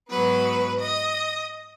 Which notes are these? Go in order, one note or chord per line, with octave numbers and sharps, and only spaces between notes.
G#2 F#3 B3 B4
D#5